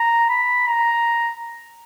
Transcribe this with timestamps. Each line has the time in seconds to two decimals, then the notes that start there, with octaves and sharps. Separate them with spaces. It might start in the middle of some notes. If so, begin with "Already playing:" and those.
Already playing: A#5
0.29 B5
0.67 A#5